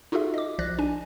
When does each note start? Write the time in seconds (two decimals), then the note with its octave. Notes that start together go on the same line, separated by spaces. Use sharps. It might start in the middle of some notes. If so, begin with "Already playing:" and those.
0.12 D#4 F4 F#4 G#4 A4 E5
0.34 D#5 D6
0.59 B1 F3 D5 F#6 A#6
0.79 D4 G#5